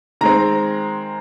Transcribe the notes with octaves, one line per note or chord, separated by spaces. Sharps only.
D#3 G#3 C4 A#5